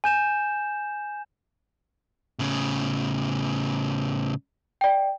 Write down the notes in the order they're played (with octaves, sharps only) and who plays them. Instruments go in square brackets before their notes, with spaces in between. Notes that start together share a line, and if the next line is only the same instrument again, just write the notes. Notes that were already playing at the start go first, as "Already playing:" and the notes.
[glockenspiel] G#5 G6 E7
[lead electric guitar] A2 C#3
[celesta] D5 G5